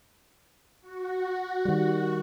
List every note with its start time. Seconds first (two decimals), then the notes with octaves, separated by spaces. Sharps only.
0.82 F#4
1.65 D#3 G3